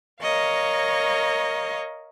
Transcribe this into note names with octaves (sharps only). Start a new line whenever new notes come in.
A#4 C#5 D#5 F5 C#6